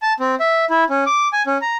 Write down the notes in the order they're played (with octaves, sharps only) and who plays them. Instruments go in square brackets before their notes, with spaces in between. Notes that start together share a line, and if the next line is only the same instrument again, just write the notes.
[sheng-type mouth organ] A5
C4
E5
E4
C#4
D6
G#5
C#4
A#5